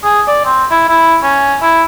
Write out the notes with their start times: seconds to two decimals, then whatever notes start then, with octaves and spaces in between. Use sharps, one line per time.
0.04 G#4
0.28 D5
0.45 C4
0.71 E4
0.88 E4
1.23 C#4
1.62 E4